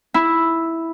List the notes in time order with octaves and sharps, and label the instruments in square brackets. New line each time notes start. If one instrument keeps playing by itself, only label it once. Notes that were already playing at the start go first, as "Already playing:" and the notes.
[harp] E4